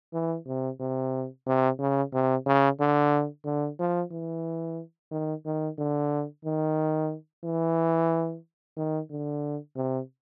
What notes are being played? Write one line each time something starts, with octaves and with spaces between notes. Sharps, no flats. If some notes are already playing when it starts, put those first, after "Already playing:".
E3
C3
C3
C3
C#3
C3
C#3
D3
D3
F3
E3
D#3
D#3
D3
D#3
E3
D#3
D3
C3